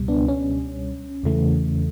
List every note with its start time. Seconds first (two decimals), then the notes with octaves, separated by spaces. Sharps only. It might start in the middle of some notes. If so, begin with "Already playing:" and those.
Already playing: C#2 B2 G3
0.08 B3 D4
0.28 C#4
1.23 E2 C#3 E3 A3